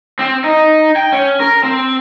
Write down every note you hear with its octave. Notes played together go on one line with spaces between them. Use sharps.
C4
D#4
G5
C#4
A#4
C4